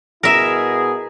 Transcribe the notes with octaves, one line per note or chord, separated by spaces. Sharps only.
B2 E4 G#4 A#4 E5